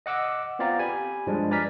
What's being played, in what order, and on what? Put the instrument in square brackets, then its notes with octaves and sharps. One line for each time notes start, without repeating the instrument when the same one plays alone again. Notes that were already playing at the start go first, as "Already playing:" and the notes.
[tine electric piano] D#5 F#5 D6 E6
B3 C4 F4 D5 F5 A#5
G4 G#5 B5
G2 F3 G3 G#3 D4
B4 D5 G#5 A#5 F6 B6